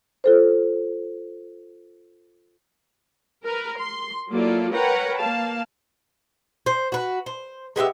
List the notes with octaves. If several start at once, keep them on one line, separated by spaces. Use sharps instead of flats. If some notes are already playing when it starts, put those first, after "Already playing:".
F4 A4 C5
A#4 B4
C6
F#3 A#3 E4 F4 A4 D5
A#4 B4 C#5 F#5 G5 A#5
A#3 F5 A5
C5
F#4 B4
C5
G#3 B3 G4 E5